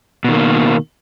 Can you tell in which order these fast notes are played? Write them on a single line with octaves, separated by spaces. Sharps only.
B2 D#3 A#3